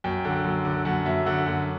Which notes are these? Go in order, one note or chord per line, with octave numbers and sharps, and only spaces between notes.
F#2 G5
D3
F#2
D3
F#2 F#5
F#2 E5
D3 F#5
F#2